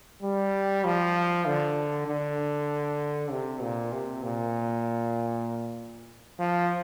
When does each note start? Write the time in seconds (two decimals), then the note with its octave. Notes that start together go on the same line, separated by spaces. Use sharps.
0.23 G3
0.84 F3
1.46 D3
2.07 D3
3.31 C3
3.61 A#2
3.92 C3
4.23 A#2
6.40 F3